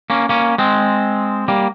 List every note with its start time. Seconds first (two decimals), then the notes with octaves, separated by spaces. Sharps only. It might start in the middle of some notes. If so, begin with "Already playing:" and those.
0.10 A#3 C#4
0.29 A#3 C#4
0.58 G#3 C4
1.48 G3 A#3